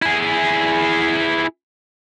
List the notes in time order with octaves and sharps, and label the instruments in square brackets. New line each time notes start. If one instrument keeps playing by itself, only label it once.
[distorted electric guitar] E4 G#4